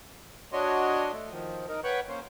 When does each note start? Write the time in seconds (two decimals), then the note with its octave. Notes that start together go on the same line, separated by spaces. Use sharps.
0.53 D4 F#4 C#5 D#5 C6
1.12 A3
1.31 D#3 F3
1.68 D#4 A#4
1.84 B4 C#5 F#5 G5 B5 C#6
2.09 A#3 C#4 C5